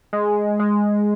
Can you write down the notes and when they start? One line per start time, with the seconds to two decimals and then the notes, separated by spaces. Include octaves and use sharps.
0.13 G#3
0.59 G#3